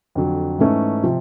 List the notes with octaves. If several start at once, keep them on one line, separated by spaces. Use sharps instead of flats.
F2 D3 F#3
G#2 E3 A3 C#4
C3 F3